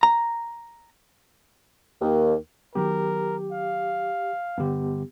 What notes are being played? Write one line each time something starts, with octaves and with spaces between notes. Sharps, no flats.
A#5
D#2
D#3 F#3 B3 G4 A#4
F5
G2 D3 B3 G4